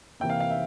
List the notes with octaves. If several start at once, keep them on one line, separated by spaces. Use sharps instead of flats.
C3 E3 A#3 G5
F5
F5
E5